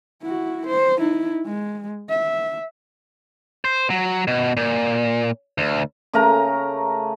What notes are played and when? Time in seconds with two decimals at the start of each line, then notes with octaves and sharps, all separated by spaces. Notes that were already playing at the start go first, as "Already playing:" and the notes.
0.22 E4 F#4
0.67 C5
0.98 D#4 E4
1.46 G#3
2.09 E5
3.65 C5
3.90 F#3
4.28 B2
4.57 A#2
5.58 D2
6.13 C#3 A3 A#4 A#5